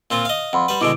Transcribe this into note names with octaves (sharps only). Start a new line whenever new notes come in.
A#2 C4 F4
D#5 F5
F2 F#5 B5 C6
G3 B4
B2 D3 G#3 E4 D6 D7